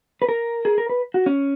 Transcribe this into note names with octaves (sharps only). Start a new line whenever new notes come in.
B4
A#4
G#4
A#4
B4
F#4
C#4